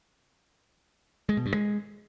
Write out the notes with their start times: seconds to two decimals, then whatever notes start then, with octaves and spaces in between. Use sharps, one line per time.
1.29 G#3
1.37 B2
1.46 G2
1.54 G#3